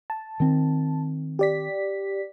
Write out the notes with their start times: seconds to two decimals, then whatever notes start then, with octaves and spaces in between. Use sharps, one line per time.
0.10 A5
0.40 D#3 C4
1.39 G4 D5 B6